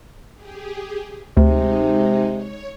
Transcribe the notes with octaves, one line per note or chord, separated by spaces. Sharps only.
G4 G#4
D2 C3 G#3 D#4
C#5